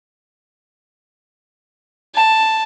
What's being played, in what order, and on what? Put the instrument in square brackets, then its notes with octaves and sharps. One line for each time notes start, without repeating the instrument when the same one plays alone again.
[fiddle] A5